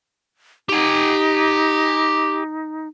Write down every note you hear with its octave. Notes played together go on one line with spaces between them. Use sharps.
D#4 G4 G#5